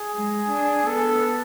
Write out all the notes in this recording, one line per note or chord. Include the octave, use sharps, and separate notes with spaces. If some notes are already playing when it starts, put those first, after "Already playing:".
Already playing: G#4
G#3
D4
B3 A4